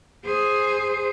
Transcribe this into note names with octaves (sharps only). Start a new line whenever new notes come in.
G#4 C5